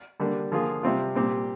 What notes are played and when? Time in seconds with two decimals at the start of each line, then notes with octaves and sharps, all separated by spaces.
0.20 D3 G3 A#3 D4
0.52 D3 F3 A#3 F4 G#4
0.83 C3 G3 C4 F4
1.15 A#2 G3 C4 G4